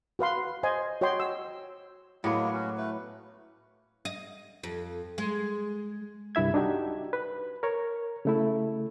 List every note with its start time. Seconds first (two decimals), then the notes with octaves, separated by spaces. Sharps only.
0.19 F#4 B4 F5 C6
0.63 C5 D#5 G#5 C6
1.01 F#4 C#5 D#5 G5 C6
1.20 E6
2.24 A2 F#3 G#3 A#3 B3
2.53 C#4 F#4
2.77 A3 B4
4.05 D#5
4.63 F2
5.18 G#3
6.35 C2 G2 E4 E5 G#6
6.54 D4 D#4 F#4 G4
7.13 B4
7.63 A#4 C#5
8.25 C#3 A3 E4